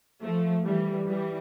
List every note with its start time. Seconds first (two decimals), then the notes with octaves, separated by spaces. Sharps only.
0.23 F3 A3
0.65 E3 G3
1.07 E3 G3